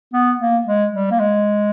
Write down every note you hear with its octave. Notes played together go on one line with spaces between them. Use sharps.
B3
A#3
G#3
G3
A#3
G#3